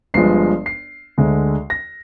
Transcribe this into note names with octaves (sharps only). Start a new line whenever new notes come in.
G1 G2 F3 G#3 C7
C7
D2 D3 G#3
A#6